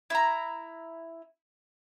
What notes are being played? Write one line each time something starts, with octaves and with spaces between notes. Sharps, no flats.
E4 A#5